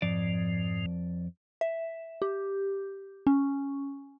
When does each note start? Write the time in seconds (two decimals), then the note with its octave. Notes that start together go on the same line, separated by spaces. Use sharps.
0.02 F2 G#2 F3 D5
1.61 E5
2.22 G4
3.27 C#4